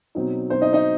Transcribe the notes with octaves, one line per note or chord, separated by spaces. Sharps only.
B2 F#3 C4 D#4
B2 F#3 C4 D#4 C5
D#4 D#5
D#4 D#5